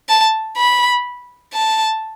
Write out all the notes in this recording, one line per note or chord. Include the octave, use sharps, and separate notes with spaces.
A5
B5
A5